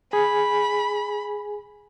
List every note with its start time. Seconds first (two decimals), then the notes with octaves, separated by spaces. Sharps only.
0.13 G#4 G#5 B5